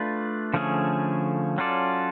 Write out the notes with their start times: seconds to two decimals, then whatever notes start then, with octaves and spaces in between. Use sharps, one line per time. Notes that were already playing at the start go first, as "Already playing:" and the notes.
Already playing: A3 D4 F4 B4 D5
0.54 D3 F3 A3 C#4 G#4
1.58 F#3 C#4 F4 A4 D5